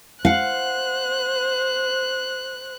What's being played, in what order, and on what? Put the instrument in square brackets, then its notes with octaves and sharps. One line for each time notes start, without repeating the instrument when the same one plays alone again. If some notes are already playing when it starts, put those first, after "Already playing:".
[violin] C5 F#6 [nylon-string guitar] F5 F#5